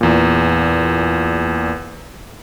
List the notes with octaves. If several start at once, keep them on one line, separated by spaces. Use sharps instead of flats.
E2 A#2